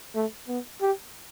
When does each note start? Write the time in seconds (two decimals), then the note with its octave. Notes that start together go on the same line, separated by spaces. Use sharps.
0.15 A3
0.48 B3
0.82 G4